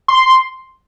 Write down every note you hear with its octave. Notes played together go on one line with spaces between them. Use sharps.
C6